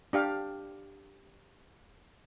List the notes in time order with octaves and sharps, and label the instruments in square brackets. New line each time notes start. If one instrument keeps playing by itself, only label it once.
[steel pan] D4 G4 F5